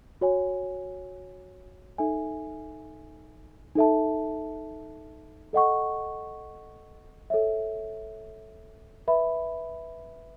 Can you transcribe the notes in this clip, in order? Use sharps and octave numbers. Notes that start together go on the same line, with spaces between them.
F#4 C#5 G#5
D#4 A4 E5 G#5
D#4 A4 E5 A5
A4 D#5 F#5 C#6
A4 C#5 E5
B4 E5 B5